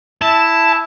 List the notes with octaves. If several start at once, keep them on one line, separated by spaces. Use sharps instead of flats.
E4 A5